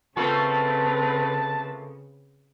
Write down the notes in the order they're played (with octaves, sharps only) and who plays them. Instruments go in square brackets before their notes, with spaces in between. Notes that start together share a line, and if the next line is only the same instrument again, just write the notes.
[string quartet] C#3 [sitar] A3 A#3 F4 [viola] C4 B4 [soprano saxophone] A5